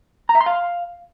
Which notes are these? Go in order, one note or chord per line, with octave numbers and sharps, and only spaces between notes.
A#5
E5
C6
F5